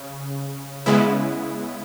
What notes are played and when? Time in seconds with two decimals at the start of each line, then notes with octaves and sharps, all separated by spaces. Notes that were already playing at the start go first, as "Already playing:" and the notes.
Already playing: C#3
0.86 C#3 G#3 B3 E4